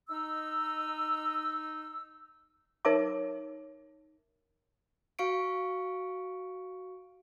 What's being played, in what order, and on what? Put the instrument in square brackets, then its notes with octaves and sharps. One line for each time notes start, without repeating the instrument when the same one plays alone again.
[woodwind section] D#4 E6
[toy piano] D#4 A#4 C#5 E5 A5 D6
[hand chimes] F#4 F5 C#6 C#7 D7